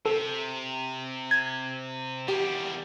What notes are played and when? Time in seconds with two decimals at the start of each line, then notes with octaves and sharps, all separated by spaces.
0.05 C3 A4
1.31 G#6
2.28 E2 G3 G4